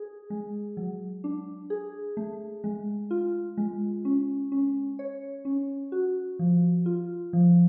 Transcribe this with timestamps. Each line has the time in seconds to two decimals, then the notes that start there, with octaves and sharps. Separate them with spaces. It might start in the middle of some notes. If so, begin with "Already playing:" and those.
Already playing: G#4
0.30 G#3
0.77 F#3
1.24 D4
1.70 G#4
2.17 A3
2.64 G#3
3.11 F4
3.57 G#3
4.05 C#4
4.52 C#4
4.99 C#5
5.45 C#4
5.92 F#4
6.39 F3
6.86 F4
7.33 F3